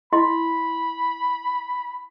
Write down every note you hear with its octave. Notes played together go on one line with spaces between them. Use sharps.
E4 D#5 B5 C6